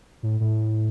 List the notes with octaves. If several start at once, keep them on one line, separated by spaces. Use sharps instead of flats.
A2
A2